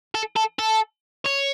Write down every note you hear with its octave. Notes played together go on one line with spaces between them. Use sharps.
A4
A4
A4
C#5